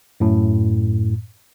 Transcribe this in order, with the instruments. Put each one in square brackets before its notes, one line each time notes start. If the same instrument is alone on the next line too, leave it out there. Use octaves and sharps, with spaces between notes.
[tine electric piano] F#2 A2